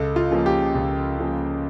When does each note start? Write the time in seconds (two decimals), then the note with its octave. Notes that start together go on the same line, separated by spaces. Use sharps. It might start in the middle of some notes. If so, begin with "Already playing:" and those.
Already playing: C#2 A4
0.16 F4
0.30 C#3 F3 A#3 C#4
0.46 G4
0.75 C#2
1.18 C#3 F3 A#3 C#4